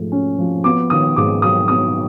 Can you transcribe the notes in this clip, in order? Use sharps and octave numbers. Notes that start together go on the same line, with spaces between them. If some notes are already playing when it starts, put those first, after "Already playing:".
Already playing: G#2 F3 A3
C#4
F3
B3 D6
D#3 D#6
G#2 D6
F#3 D#6
B3 D#6